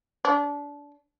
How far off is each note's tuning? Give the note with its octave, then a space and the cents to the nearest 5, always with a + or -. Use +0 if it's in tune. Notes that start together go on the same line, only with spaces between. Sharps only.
D4 -25